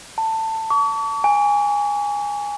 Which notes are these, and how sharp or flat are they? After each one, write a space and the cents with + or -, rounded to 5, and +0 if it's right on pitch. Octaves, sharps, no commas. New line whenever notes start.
A5 +15
C#6 +45
G#5 -15